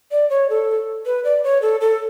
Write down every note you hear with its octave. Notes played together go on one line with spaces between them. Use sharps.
D5
C#5
A4
B4
D5
C#5
A4
A4